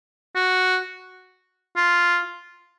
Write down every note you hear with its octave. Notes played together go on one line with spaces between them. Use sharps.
F#4
F4